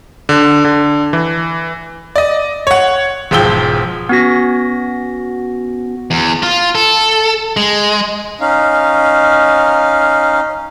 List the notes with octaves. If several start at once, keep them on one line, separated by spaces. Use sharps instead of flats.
D3
D3
E3
D5 D#5
C#5 F#5
E1 G#2 F3 G5 E6 G7
B3 C#4 F#4 A#6
E2
F4
A4
G#3
C#4 D#4 F5